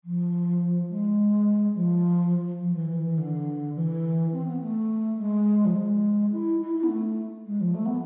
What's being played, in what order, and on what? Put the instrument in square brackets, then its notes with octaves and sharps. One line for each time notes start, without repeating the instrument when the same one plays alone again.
[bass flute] F3
G#3
F3
F3
E3
E3
E3
D3
E3
C4
B3
A3
G#3
F3
G#3
E4
E4
E4
B3
A3
G#3
F3
A3
B3